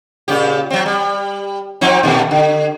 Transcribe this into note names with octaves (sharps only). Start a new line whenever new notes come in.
A#2 C#3 G4
F#3 C4
G3
F3 C4 D#4
A#2 D#3 A3
D3